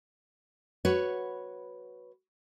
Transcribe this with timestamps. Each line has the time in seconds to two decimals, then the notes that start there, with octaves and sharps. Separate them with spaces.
0.85 F#4 B4 C#5